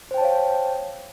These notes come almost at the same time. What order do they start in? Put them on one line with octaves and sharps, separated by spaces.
C5 G5 A5 C#5 F5